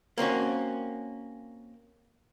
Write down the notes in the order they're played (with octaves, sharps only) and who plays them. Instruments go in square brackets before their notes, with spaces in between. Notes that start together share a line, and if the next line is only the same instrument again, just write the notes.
[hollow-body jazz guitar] A#3 C4 C#4 F#4